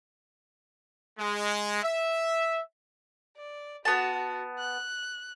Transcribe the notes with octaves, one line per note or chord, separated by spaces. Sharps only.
G#3
E5
D5
B3 F#4 A5
F#6